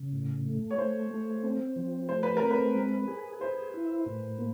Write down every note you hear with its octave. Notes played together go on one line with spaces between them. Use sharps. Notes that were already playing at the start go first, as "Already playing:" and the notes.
Already playing: C#3
A2
A3
C#5
A3 C5
A3
C4
F3
A3 C5
B4
C4 A#4
B4
G#3
G#4
G#4 C5
E4
A2
A#3